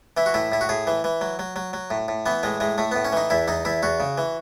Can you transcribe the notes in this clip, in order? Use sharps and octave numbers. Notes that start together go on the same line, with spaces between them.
E3 E4
F#4
A2 E4
A2 E4
F#4
A2 G#4
E3
E3
F#3
F#3
F#3
F#3
A2
A2
E3 B3
A2 G#3
A2 G#3
A2 A3
A2 B3
C#4
E3 D#4
E2 E4
E2 D#4
E2 E4
E2 F#4
C#3
E3